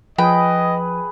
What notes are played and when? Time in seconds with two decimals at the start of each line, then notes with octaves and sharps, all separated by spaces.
0.18 F3 G#4 B4 D#5 G5 B5